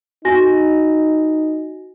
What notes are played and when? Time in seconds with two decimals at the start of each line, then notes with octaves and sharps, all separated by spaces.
0.25 D#4 F#4 G#5 A#6